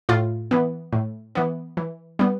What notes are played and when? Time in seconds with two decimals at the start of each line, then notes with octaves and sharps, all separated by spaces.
0.09 A2 F4
0.51 E3 B3
0.93 A2
1.35 E3 B3
1.77 E3
2.19 G3 B3